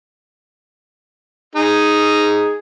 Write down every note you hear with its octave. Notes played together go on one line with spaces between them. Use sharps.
D#4 G#4